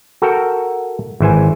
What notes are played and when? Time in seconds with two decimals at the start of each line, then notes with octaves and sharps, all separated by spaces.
0.22 F#4 A4 A#4 G5
1.20 G#1 E3 C5 G#5